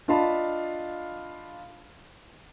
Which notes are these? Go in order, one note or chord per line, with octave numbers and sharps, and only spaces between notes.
D4 F4 D#5 F5 A5 B5